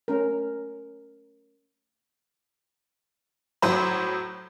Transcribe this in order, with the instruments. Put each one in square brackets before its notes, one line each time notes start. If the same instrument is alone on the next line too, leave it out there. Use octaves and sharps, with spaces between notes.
[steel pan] A3 C#4 A#4
[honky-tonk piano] A2 F#3 C5 B5